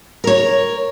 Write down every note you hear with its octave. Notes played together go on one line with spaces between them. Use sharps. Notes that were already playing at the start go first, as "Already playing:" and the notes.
A#4 C#5